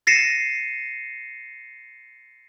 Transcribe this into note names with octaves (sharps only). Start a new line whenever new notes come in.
A6 A#6 C7 C#7 D#7 E7